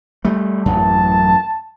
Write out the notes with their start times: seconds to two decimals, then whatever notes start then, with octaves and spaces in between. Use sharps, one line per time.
0.25 G3 A3
0.66 A1 F#2 A5